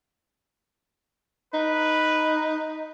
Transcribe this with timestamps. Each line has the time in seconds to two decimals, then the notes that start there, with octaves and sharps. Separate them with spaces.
1.54 D#4 B4